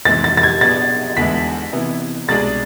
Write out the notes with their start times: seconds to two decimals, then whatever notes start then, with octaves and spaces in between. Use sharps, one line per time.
0.05 F2 C3 E3 G#3 A6
0.24 A6
0.37 A6
0.43 G#6
0.61 B2 B3 D4 G#4 A6
1.17 E2 D3 G#3 B3 E4 B6
1.73 C3 E3 B3 E4
2.28 C2 B2 G#3 D4 G#4 A6